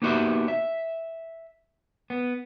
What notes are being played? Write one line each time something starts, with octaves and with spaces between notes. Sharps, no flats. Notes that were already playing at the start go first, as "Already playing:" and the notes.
A#3 B3 D#4 F#4 G4 E5
E5
B3